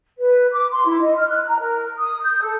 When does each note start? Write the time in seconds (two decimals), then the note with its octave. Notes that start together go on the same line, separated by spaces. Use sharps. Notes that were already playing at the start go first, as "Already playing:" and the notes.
0.19 B4
0.52 D6
0.72 C6
0.86 E4
1.02 D#5
1.16 F6
1.30 F#6
1.47 A#5
1.60 A#4
1.98 D#6
2.22 G6
2.41 A4